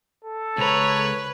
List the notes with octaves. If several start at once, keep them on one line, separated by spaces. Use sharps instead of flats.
A4
C#2 B4 C#5 A#5